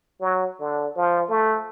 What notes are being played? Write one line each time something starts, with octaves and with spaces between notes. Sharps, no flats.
F#3
D3
F3
A3